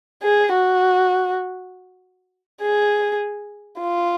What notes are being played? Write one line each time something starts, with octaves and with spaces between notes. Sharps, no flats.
G#4
F#4
G#4
F4